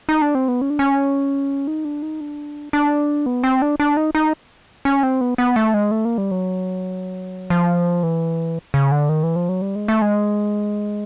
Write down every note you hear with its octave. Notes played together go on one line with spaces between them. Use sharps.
D#4
D4
C4
B3
C#4
D4
C#4
D#4
D4
D#4
D4
D4
B3
C4
D4
D4
D#4
D#4
C#4
C4
B3
B3
A3
G#3
A3
A#3
G3
F#3
F3
E3
C#3
D3
D#3
E3
F3
F#3
G3
G#3
A3
G#3